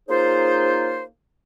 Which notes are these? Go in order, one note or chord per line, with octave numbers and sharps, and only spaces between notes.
A#3 C#4 D#4 F4 G#4 C5